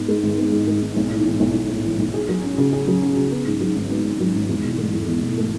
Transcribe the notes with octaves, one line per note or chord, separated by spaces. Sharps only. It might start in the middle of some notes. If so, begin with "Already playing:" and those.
Already playing: G#2 B3
G#3
G#1
B3
G#2
G#3
G#1
B1
A2
E3
B1
B1
A2
E3
B1
G#4
F#3
C#4
C#3
G#4
F#3
C#4
C#3
B3
G#2
F#3
G#1
B3
G#2
F#3
G#1
E2
B2
A3
E2
E2
B2
A3